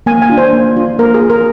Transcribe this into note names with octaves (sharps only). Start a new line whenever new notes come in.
A#3 G#5
G#5
D4 F4
C5
A#3
D4 F4
A#3 A#4
G#4
F4
A#4